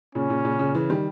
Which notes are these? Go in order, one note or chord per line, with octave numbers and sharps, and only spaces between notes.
A#2 C#3 C#4
A#2 C#3
A#2 C#3
A#2 C#3
C#3 E3
D#3 G3